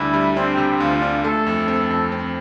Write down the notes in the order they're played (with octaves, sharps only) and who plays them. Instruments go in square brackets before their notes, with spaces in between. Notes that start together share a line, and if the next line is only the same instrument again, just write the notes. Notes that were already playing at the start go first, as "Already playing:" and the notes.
Already playing: [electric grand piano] D2 G3 D4 [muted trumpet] E4
[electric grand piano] G3
[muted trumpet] C4 [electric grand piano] D4
[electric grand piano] C3
[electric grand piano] D2 [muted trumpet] F4
[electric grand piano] D4
[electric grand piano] A3 [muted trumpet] A4
[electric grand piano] F2
C4
F2
C4